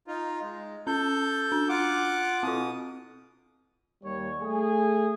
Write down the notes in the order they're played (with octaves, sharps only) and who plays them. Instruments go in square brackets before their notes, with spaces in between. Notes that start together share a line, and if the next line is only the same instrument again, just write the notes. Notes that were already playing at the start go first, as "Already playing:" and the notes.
[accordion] D#4 F4
G#3
[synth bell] C#4 [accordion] A4 G6
[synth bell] D4
[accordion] F4 F#5 D6
[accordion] B2 D#6 [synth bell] C4 F4
[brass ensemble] D#2 G3 C#5
A3 G#4